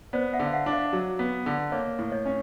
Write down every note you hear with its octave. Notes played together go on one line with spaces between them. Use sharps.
B3 C5 D5
E5 F#5
D3
F5
E5 F#5
D4
D#5 F5
F#3
B3
D3
A#3 C#5 D#5
A2
C#5 D#5
C#4